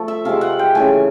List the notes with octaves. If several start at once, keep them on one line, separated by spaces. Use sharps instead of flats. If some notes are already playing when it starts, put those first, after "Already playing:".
Already playing: F3 A3
E5
C3 F3 G#3 F5
F#5
G5
C#3 E3 A3 G#5